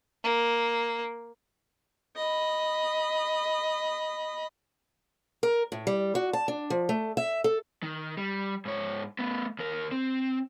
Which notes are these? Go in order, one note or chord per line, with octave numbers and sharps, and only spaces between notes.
A#3
D#5 B5
A#4
A2
G3
F#4
A5
D4
F3
A3
E5
A4
D#3
G3
G#2 C#5
A3 B3
D#2 A#4
C4